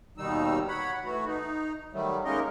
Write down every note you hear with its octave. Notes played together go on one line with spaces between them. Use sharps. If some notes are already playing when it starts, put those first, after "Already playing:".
D#2 B2 D#3 G3 D#4 E6
C#5 F#5 B5
E3 A3 F#4
D#4
D#3 F#3 G3 A3
G#3 A#3 C#4 D#4 A#4 D#5